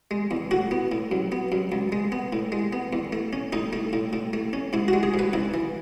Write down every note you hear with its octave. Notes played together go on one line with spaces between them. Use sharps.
G#3
E2
A2 F#4
B3
A2
F#2
B3
F#2
C#2
G#3
B3
A2
G#3
B3
E2
A3
C#4
A2 D#4
A3
A2
A2
A3
C#4
G#2 E4
F#4
G#3
G#4
G#2
B4
C#2 E4
E3